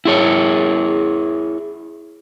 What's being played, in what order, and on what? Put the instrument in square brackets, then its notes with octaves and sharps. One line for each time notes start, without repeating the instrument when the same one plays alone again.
[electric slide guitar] E4 G#4 C#5